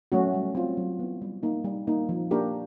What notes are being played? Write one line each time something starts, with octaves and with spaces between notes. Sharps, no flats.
F#3 A3 C#4 F#4
G3
C4 F4
F#3
B3 E4
G3
A#3 D#4
G3
A#3 D#4
F3
A#3 D4 G4 A#4